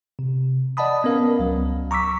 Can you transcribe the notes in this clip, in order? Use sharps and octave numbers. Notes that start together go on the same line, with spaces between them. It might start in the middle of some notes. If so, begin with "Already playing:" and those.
C3
D5 D#5 F#5 A5 B5 D#6
B3 C#4 A#4 F5
C#2 F#3
A#5 C#6 D6 E6 B6